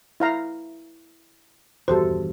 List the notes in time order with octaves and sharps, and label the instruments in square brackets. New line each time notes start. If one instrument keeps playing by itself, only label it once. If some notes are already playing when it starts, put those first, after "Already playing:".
[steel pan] E4 F5 A#5
[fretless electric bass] D#1 E2 G2 [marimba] F#4 G4 [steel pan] A4 C5